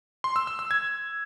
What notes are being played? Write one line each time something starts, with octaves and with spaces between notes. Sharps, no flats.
C6
E6
E6
E6
G#6